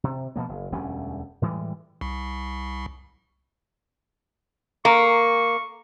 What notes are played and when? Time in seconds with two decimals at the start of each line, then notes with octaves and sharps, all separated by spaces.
0.04 C3
0.36 B2 F3 A#3
0.49 F#1
0.72 E1 D2 G3 C#4
1.42 A2 E3 G3 G#3
2.01 C2
4.85 A#3 C#6